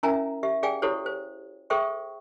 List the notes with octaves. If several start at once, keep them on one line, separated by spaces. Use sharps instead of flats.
C#4 E4 A#4 E5 G#5 A#5
G4 E5
G#4 D5 F5 G5 G#5
E4 F#4 G4 A4 C5 C#5
C5
G#4 A4 C5 E5 G5 C#6